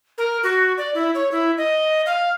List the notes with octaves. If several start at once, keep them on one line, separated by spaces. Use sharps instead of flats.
A#4
F#4
D5
E4
C#5
E4
D#5
F5